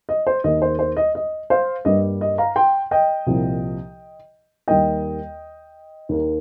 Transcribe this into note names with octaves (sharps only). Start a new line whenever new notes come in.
D#5
C5
D#2 D#3 A#3 D#5
C5
C5
D#5
D#5
C5 F5
G2 G3 A#3 D#5
D#5
F5 A#5
G5 C6
D#5 G5
C2 A#2 F3
D#2 D#3 G3 A#3 D#5 G5
D#2 D#3 A#3